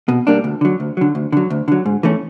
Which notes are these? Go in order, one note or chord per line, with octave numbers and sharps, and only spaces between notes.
B2
G3 A#3 D4
D2
D3 F#3
D2
D3 F#3
D2
D3 F#3
D2
D3 F#3
G#2
E3 A3 C#4